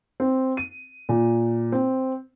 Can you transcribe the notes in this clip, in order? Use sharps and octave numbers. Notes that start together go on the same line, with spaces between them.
C4
D#7
A#2
C4